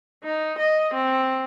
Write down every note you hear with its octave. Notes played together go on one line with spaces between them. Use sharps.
D#4
D#5
C4